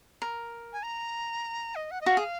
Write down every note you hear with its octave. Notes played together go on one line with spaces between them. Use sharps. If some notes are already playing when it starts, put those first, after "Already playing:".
A#4
G#5
A#5
D#5
F#5
D#5
F#4 F5
G#4